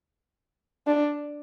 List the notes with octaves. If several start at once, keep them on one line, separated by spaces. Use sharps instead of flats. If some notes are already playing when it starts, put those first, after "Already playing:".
D4